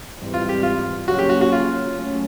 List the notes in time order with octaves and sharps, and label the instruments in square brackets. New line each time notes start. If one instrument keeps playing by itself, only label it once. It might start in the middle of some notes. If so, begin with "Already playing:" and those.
[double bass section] G#2 E3 G3 C4
[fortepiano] F4
G4
F4
[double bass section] C#3 F#3 A#3 C#4 [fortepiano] F#4
[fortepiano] G4
F#4
F#4
F4
[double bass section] F#3 A3 C#4